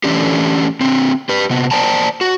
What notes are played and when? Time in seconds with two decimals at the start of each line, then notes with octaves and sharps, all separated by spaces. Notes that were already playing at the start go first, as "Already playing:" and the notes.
0.04 E3 A3 C#4 D4 G4
0.81 D3 C4
1.29 G4 B4
1.50 C3 B3
1.71 C5 D5 G5 A5 A#5
2.21 F#4